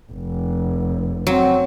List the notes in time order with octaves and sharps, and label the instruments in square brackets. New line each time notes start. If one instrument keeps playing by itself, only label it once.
[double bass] F1
[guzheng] F#3 [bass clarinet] C4